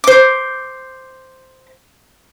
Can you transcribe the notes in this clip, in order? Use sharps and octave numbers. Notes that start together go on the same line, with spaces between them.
C5 D6